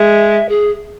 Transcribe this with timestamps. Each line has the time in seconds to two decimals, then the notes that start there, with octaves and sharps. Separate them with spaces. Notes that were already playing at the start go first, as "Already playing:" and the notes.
Already playing: G#3 E5
0.49 G#4